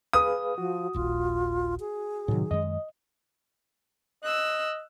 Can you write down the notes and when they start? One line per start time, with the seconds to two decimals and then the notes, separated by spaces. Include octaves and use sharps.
0.13 G#4 B4 F5 D#6
0.58 F3 F#4
0.94 D#1 A#1 F4
1.80 G#4
2.28 A2 C3 D#3 F#3
2.51 F#2 D#3 G#3 D#5
4.23 D#5 E6 F#6